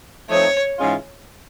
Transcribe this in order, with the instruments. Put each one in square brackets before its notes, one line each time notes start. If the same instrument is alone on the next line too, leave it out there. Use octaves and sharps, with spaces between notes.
[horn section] F3 A3 C4 D#4 [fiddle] C#5
[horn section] G#2 E3 G#3 C#4 F4